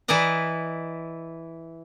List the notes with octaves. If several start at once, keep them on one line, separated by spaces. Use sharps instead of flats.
E3 E4 D5 D#5 A#5